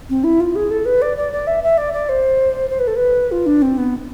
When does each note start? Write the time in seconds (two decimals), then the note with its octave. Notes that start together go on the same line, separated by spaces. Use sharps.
0.09 C4
0.24 E4
0.40 F4
0.55 G#4
0.70 A4
0.85 B4
1.02 D5
1.17 D5
1.32 D5
1.47 E5
1.63 E5
1.77 D5
1.93 D5
2.09 C5
2.70 C5
2.79 B4
2.87 A4
2.96 B4
3.31 F4
3.46 D4
3.62 C4
3.78 B3